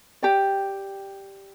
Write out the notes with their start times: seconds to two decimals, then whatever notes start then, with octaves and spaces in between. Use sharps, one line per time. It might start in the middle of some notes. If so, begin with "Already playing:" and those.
0.22 G4 D5 G5